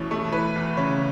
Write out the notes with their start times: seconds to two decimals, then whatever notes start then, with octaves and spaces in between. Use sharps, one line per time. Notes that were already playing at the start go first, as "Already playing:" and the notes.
Already playing: B2 E3 A3 C#4 C#5
0.11 A3
0.32 E3 B4
0.56 E2
0.77 C#3 C#5